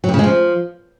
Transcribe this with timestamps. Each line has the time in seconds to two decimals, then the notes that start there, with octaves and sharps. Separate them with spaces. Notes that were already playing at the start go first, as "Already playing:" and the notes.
0.04 F#3
0.09 G2
0.14 C#3
0.19 G#3
0.24 F3